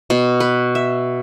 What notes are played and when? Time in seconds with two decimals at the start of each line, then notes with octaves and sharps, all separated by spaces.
0.10 B2
0.40 B4
0.75 E5